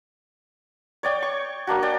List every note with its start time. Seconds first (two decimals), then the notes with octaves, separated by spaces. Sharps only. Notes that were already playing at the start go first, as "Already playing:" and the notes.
1.03 C#5 D5 G5
1.22 C#6
1.67 A#3 D4 F#4
1.82 C#5 D5 G5